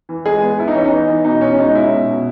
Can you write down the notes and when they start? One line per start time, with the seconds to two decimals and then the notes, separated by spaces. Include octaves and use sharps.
0.09 E3
0.26 G#3 G#4
0.42 B3
0.58 B3 E4
0.68 D#4
0.75 E3 C#4
0.85 D#4
0.91 B3
1.09 E3
1.24 B2 D#4
1.41 B2 C#4
1.58 G#3 D#4
1.75 C#4 E4
1.92 B2
2.09 B2